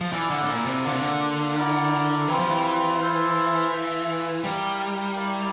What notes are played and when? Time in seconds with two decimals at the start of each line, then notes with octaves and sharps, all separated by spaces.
0.01 F3
0.12 E3 E4 A4 D5 F5
0.30 D3
0.42 A2
0.49 A#2
0.66 C3
0.85 D3 A#3 D4 F4
0.92 C3
0.99 D3
1.56 E4 A#4 D5
2.28 E3 G3 C4 F4
2.39 F3
2.50 E3
3.00 E4 A4 C5 F5
3.72 F4 A4 E5
4.44 G3 E4 A#4 F5
5.16 E4 A#4 D5 F5